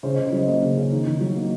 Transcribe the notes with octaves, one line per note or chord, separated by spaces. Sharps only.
C#3 C5
C#3 D#5
C5
F#3 D#5
A#3 D#5
C#3
C#3
D#3
D#3
F#3
A#3